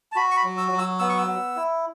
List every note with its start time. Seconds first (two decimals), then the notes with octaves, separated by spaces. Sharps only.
0.12 A5
0.16 F#4 B5
0.31 C#6
0.37 B5
0.44 F#3
0.58 E6
0.72 F#3
0.79 E6
0.99 B3 E6
1.09 C#6
1.18 E6
1.27 B3
1.56 E4